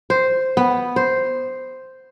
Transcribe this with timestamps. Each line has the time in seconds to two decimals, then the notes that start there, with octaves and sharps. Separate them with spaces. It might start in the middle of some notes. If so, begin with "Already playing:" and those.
0.10 C5
0.57 B3
0.96 C5